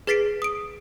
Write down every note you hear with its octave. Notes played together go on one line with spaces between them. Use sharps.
G#4 B4 A6 B6 C7 D7
D#6 D7